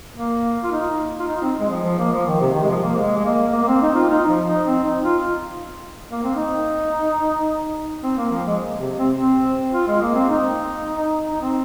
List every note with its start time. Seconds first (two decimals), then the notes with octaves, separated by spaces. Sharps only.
0.15 A#3
0.64 F4
0.71 D#4
1.19 F4
1.27 D#4
1.42 C4
1.60 G#3
1.70 F3
1.84 F3
1.98 A#3
2.13 F3
2.27 D#3
2.40 C3
2.54 D#3
2.63 G#3
2.69 F3
2.82 A#3
2.96 G#3
3.17 G#3
3.25 A#3
3.53 A#3
3.63 A#3
3.67 C4
3.82 D#4
3.95 F4
4.09 D#4
4.28 F3
4.46 D#4
4.66 C4
4.84 D#4
5.03 F4
6.12 A#3
6.23 C4
6.35 D#4
8.03 C4
8.17 A#3
8.31 F3
8.46 G#3
8.79 C3
8.97 C4
9.16 C4
9.73 F4
9.88 G#3
10.02 A#3
10.15 C4
10.29 D#4
11.31 D#4
11.41 C4